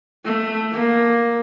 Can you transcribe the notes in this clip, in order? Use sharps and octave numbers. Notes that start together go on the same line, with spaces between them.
A3
A#3